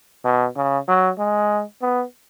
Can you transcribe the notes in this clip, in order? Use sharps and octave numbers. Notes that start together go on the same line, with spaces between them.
B2
C#3
F#3
G#3
B3